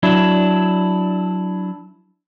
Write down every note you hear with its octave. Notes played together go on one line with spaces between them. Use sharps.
F#3 D4 E4